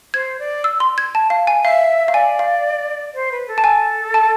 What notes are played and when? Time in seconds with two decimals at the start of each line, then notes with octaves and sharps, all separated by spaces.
0.14 C5 G#6
0.39 D5
0.64 E6
0.80 C6
0.98 G#6
1.15 A5
1.30 F5
1.47 G#5
1.64 E5 F5
2.08 F5
2.14 D5 G#5
2.39 F5
3.14 C5
3.32 B4
3.48 A4
3.58 A5
3.64 G#5
4.14 A5